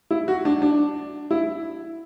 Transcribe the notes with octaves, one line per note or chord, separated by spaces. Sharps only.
E4
F#4
D4
D4
E4